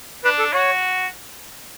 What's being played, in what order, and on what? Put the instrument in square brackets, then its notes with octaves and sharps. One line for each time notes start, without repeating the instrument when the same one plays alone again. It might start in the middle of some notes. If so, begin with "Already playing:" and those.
[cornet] D4 [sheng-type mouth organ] B4
[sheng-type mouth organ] A4
[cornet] F#4 [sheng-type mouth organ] C#5